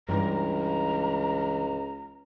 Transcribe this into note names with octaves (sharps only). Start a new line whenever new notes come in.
C#2 G2 E3 A#5